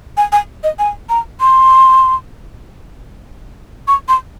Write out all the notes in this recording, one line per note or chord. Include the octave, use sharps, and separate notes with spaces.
G#5
G#5
D#5
G#5
A#5
C6
C#6
C6